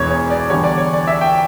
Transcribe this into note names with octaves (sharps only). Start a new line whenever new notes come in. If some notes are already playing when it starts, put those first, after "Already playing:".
Already playing: E1 E2 B2 C#5
C#5
D5
E2 D3 G3 D4 C#5
D5
C#5
D5
E5
G5